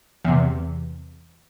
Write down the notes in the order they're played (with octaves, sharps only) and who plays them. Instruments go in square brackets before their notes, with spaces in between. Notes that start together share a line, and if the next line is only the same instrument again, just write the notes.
[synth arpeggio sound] E2 C3